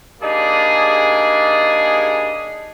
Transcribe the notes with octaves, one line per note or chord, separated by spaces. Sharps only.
G3 A#3 D4 D#4 G#4